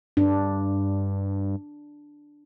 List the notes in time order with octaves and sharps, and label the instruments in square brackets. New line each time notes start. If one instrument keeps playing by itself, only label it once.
[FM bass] G2 [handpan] D4